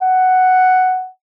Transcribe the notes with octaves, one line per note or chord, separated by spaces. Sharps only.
F#5